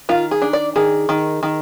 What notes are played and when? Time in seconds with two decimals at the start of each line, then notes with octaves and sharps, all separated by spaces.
0.09 D#3 F4
0.31 G#4
0.42 D4
0.53 D5
0.76 D#3 G#4
1.09 D#3
1.43 D#3